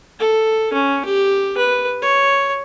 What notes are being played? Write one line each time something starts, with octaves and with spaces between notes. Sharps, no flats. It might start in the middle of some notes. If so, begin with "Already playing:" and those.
A4
C#4
G4
B4
C#5